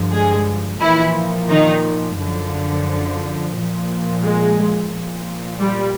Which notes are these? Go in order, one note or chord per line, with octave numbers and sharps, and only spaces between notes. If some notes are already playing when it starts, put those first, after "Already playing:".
Already playing: G2 D3 F3
G#3 G#4
A#2 E3 F3 E4
D#3 D#4
F#2 D3 F3
A#2 F3
G#3
A#2 F3
G3